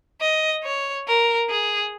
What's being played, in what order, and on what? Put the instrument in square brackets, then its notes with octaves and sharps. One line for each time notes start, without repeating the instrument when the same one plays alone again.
[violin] D#5
C#5
A#4
G#4